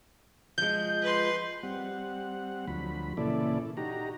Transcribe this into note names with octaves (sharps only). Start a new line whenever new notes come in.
F3 G#3 G6
B4 C6
G3 C4 F#5
D2 F3 F#3 B5
A#2 C#3 E3 E4 A4 D5
D#4 F#4 G4 A#5